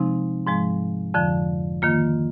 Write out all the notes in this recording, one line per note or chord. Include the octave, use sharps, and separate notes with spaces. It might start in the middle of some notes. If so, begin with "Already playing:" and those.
Already playing: C3 F3 G#3 C4 D#4
G#2 F3 G#3
F2 D3 F3
D#3 A#3 F4